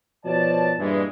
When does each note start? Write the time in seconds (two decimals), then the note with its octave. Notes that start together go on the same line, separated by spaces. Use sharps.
0.25 B2 F3 F#4 C#5 D5 A5
0.79 G2 A#2 E3 G#3